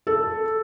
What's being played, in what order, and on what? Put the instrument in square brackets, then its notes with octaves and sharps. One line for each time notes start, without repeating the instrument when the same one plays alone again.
[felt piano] A4